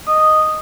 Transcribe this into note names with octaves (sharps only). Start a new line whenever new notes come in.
D#5